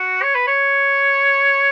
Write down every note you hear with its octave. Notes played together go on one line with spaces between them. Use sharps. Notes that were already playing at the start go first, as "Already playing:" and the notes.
Already playing: F#4
C#5
B4
C#5